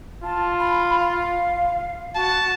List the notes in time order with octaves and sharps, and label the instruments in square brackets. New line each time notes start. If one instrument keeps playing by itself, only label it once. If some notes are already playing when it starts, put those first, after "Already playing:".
[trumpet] F4 [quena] A5
[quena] B5
F5
[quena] F#4 [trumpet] A5